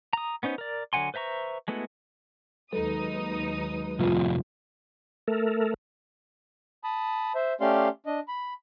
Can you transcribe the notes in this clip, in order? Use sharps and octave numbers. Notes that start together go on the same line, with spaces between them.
A#5 D#6
B3 C#4 D#4 C5
A#4 D5
D3 F#3 F#5 G#5 C6
B4 C5 E5 A#5 C#6
G#3 A3 B3 E4 F#4
D#2 F#3 G#3 D#4 A4 B4 D#6
C2 F2 F4
A3 A4 A#4
A5 B5 D#6
C5 E5
A3 C#4 G4 D5 F5 C6
D4 D#5
B5